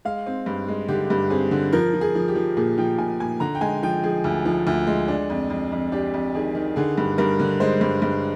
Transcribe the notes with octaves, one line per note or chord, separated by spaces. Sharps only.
G#3 F5
C4
G2
G#3
D3 G4
G2
C4 G#4
D3
F3 A#4
F3
G#4
F3
G4
F3
A#2 G#4
F3 G5
A#2 G#5
A#2 G#5
D3 A#5
G5
G#3 G#5
F3 G5
F3 G#4
D2
F3
D2
G#3
D4
F2
F2
F2
D4 G4
F2
D#3 G#4
D#3
D3 G#4
G2
G2 A#4
D3
G#3 C5
G2
G2